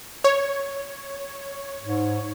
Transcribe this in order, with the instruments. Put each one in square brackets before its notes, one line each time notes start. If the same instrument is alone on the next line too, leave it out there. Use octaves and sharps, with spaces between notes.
[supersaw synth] C#5
[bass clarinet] G#2